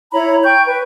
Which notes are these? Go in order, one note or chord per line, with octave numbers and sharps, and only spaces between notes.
E4 C#5 A#5 B5
G5 C#6 G6
B4